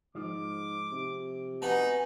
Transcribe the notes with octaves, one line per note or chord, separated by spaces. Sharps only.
G#2 F3 D6
C3
B3 D#4 F#4 G#5